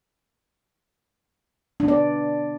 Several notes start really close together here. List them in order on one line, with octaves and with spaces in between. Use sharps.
D4 B3 D5